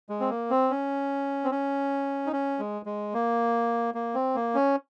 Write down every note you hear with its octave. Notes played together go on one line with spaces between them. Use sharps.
G#3
C4
A#3
C4
C#4
C4
C#4
D#4
C#4
G#3
G#3
A#3
A#3
C4
A#3
C#4